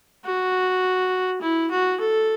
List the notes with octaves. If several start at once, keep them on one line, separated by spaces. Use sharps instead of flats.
F#4
E4
F#4
A4